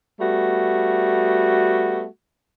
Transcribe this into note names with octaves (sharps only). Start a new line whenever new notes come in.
G3 A3 B3 F#4